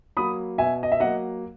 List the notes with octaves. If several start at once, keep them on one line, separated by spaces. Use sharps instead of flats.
F#3 A#3 B5 D#6
B2 E5 G#5
D#5
E5
F#3 A#3 D#5 F#5